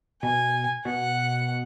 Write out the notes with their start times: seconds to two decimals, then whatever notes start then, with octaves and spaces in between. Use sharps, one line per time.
0.22 B2 G#5
0.85 B2 F#5